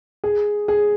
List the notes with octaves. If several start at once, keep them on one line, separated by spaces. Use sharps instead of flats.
G#4
G#4